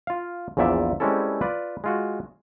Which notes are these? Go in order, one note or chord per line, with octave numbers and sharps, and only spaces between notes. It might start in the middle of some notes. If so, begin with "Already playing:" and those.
F4 F5
A#1 E2 A#2 D5 E5
G3 G#3 C4 C#4 E4 A4
F4 B4 D5
G#3 F4 F#4